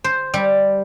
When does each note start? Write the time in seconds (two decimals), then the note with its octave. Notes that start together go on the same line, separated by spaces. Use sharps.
0.04 C5
0.34 G3